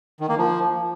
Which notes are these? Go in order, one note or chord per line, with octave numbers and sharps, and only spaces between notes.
D#3
A#3
F3